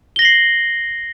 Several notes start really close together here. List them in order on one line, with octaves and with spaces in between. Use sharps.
G7 A#6 F#7 C7